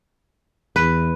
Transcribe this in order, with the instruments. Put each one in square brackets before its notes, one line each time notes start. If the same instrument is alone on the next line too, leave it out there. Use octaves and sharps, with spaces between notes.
[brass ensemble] E2 [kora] B4